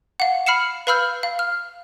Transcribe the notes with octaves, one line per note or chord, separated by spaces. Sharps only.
F5 F#5
B5 F6 C7 C#7 E7
B4 F5 B5 E6 F6 G6
F5
F6